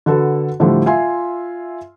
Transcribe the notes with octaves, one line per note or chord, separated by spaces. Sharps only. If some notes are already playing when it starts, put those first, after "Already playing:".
D3 F#4 A4 B4
A2 D3 F3 G3 A3
F4 E5 G#5 C6